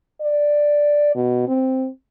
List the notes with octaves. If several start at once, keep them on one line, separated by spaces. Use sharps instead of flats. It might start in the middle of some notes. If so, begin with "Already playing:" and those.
D5
B2
C4